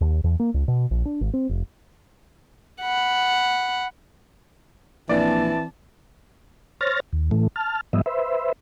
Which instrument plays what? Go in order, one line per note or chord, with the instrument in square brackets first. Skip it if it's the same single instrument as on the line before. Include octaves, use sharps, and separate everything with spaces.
[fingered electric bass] D#2
E2
A#3
C#2
B2
A#1
D4
G#1
C4
F1
[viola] F#5 B5
[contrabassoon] A#1 [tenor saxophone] E3 [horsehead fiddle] C4 A5 [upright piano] D5
[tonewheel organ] C5 C#5 F6 A6 A#6
D#2
A2 E3 A3
A5 F6
G#2 F3 G3 B3 D#5 E5
B4 C5 E5